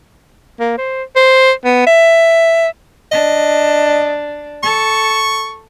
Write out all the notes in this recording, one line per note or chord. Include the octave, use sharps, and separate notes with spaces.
A#3
C5
C5
B3
E5
D4 D#5
A4 C#6